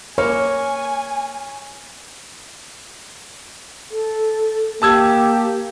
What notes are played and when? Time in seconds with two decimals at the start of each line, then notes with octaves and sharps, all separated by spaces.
0.18 A#3 C#5 G#5 C#6 F6 C#7
3.91 A4
4.82 A#3 G4 A5 E6 G#6